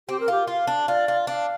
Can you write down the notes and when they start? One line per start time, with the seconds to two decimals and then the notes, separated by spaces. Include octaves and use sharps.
0.08 C4 G4
0.20 A#4
0.28 F4 G4
0.47 F4 F5
0.67 D4
0.88 F4 D5
1.08 F4
1.27 D4 F5